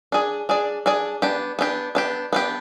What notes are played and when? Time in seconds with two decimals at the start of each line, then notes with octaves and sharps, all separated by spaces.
0.12 D4 G#4 D5
0.49 D4 G#4 D5
0.86 D4 G#4 D5
1.22 B3 D4 G4
1.59 B3 D4 G4
1.95 B3 D4 G4
2.33 B3 D4 G4